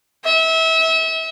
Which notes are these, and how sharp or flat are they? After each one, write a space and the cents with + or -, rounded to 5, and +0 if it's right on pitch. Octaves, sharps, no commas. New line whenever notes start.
E5 -30